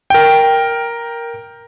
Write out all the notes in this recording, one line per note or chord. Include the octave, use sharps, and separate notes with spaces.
A#4 G5